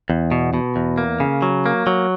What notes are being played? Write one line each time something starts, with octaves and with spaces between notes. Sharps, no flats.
E2
B2
B2
E2
A#3
C#3
F#3
A#3
F#3